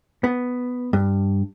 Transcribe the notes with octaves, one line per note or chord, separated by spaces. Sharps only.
B3
G2